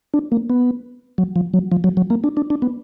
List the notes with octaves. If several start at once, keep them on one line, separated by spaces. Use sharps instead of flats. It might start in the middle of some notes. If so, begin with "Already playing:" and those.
D4
A#3
B3
F#3
F3
F#3
F3
F#3
F#3
A#3
D4
D4
D4
B3